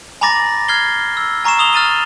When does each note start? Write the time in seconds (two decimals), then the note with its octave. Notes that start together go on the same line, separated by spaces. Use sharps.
0.21 G#5 A#5 B5 D6 A6 A#6
0.68 F6 G#6 C7 G7
1.17 E6
1.44 G#5 A#5 C#6 C7 E7
1.59 D#6 F7 G7
1.73 F6 A6 D#7 G7